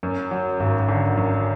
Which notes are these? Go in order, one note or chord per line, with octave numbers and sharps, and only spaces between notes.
F#2
F#3
G#1
D3
F#2